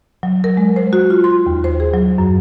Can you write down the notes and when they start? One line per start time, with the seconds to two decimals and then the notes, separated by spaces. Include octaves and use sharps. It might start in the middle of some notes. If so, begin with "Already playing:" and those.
0.23 F#3
0.44 A#4
0.57 G#3
0.76 C5
0.93 F#4
1.10 F4
1.24 C6
1.46 D#2
1.64 C5
1.80 G#4
1.94 F#3
2.18 F#2